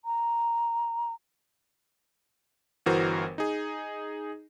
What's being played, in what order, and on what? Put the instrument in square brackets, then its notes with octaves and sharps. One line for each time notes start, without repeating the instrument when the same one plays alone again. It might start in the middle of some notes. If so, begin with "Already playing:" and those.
[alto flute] A#5
[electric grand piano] G1 E3 F#4 A#4 C5
D#4 G#4